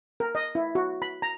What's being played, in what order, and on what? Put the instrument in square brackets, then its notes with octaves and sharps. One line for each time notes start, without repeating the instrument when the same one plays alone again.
[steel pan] A#4
D#5
E4
F#4
B5
A#5